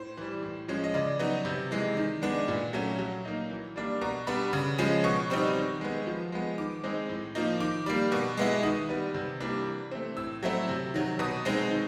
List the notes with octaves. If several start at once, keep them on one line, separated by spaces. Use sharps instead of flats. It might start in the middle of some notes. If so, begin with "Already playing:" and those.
Already playing: A2 C5
E3 G3
A2
F3 G#3 C#4
D#5
C#3 D5
F#3 B3 D#4
C3
E3 G#3
D#3
G#3 B3 D4
A#2
F#3 A3 C#4
F#3
A#3 D#4
E3
G3 A#3 D4
B2 A#5
G3 B3 D4 B5
C#3
F3 G#3 C#4
B2 C#6
G3 C4 D#4
D#3
G#3 B3
F3
G#3 B3
D#3 D6
G#3 C4 D#4
A2
F3 A#3 D#4
D#3 D6
G3 A#3
B2
G#3 B3 E4
D#3 D#6
G3 B3
C3
E3 G3 A#3 D4
E3
A3 C4
A2 E6
F#3 A3 C4 E4
C3
D#3 F#3
B2 D#6
G#3 C4 D#4
D#3